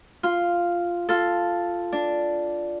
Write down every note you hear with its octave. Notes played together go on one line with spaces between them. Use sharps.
F4
F4 A4
D4